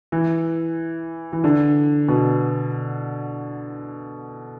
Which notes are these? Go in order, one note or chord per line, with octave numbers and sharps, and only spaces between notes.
E3
E3
D3
B2